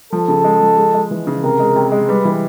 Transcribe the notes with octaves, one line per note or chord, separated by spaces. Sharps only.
F3 A4
C#3
G#3
F3
G#3
G#3
E3
C#3
C3 A#4
G#3
C3
G#3
G3 B4
E3